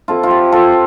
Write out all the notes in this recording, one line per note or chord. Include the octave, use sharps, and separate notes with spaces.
F3 C4 E4 F4 A4
F4
G4
F4 A4